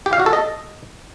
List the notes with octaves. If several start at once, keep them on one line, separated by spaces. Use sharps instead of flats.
G4
F5
F#4
A4
D#5